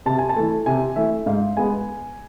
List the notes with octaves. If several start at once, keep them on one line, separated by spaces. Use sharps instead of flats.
C3 A5
G#5
A5
E3 A3
C3 G#5
E3 A3 E5
G#2 F5
G#3 B3 G#5